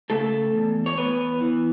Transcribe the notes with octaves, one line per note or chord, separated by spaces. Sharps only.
C#3 A3 A4
E2
C#5
E2 B3 B4
E3